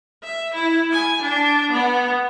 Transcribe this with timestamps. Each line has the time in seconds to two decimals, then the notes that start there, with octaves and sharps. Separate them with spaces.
0.24 E5
0.54 E4
0.92 G#5
1.22 D4
1.72 B3